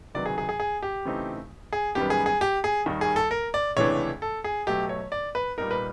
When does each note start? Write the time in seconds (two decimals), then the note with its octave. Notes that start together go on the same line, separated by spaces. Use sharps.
0.15 C#2 C3 D#3 F#3 B3 D5
0.26 G#4
0.38 G#4
0.49 G#4
0.60 G#4
0.83 G4
1.05 C#3 E3 A3 C4 D#4
1.73 G#4
1.95 F#2 D#3 G3 B3 G4
2.10 G#4
2.26 G#4
2.41 G4
2.64 G#4
2.86 D#2 D#3 G3
3.01 G#4
3.16 A4
3.31 A#4
3.54 D5
3.77 C#2 C3 E3 A3 D4 C#5
4.22 A4
4.44 G#4
4.67 B2 F#3 A3 G4
4.89 C#5
5.12 D5
5.35 B4
5.58 A#2 G3 B3 D#4 A#4
5.71 B4